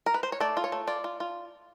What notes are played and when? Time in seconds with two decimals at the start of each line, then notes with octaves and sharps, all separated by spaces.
0.06 A#4
0.14 B4
0.23 C5
0.32 C#5
0.40 A3 D5
0.57 F4
0.64 C#5
0.72 A3
0.87 F4 D5
1.04 F4
1.20 F4